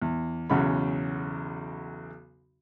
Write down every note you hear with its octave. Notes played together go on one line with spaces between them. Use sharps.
E2
B1 E2 C#3 F#3 B5